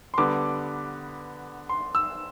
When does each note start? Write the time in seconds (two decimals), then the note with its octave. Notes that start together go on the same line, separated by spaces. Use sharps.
0.14 C6
0.18 D3 G3 B3 D6
1.69 C6
1.95 E6